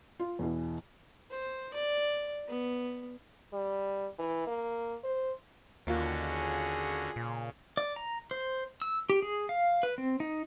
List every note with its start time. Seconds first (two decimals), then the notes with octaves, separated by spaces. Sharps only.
0.20 F4
0.39 E2 B2 E3
1.31 C5
1.74 D5
2.48 B3
3.53 G3
4.19 E3
4.47 A#3
5.04 C5
5.87 D#2 D3 A#3 C#4 F4 F#4
6.22 G#4
7.16 A#2 C#3
7.77 D5
7.96 A#5
8.31 C5
8.82 E6
9.10 G4
9.22 G#4
9.49 F5
9.83 B4
9.98 C4
10.20 D#4